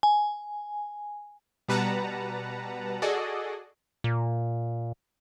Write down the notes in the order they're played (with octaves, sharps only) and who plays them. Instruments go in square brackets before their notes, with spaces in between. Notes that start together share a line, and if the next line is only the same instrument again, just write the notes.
[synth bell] G#5
[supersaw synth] B2 G3 B4 F#5 A5 A#5
F#4 G#4 A4 D5 D#5
[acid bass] A#2